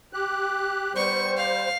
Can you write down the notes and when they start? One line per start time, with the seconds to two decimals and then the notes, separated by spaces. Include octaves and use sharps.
0.13 G4 F#6
0.95 G3 B3 C5 C#6
1.37 F5